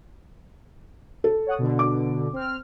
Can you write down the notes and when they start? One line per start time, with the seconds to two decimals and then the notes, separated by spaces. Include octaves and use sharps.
1.24 A4
1.46 C#5 F#5 D#6
1.59 B2 D3
1.79 D6
2.33 C4 F6